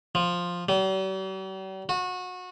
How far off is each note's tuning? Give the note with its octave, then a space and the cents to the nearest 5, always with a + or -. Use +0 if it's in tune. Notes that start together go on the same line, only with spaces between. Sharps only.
F3 +5
G3 -45
F#4 -25